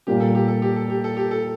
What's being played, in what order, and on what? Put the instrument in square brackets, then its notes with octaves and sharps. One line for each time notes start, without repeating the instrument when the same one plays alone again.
[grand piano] A#2 G3 A#3 F4 [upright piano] G4
[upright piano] A4
G4
A4
G4
A4
G4
A4
G4
A4